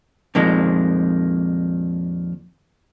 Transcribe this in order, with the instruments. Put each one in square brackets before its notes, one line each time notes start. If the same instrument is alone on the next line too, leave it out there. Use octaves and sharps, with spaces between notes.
[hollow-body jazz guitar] F2 A#2 D#3 G#3